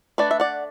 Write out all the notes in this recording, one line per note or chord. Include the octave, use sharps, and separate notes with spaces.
A3 D4 B4 D5
E5
D5 F#5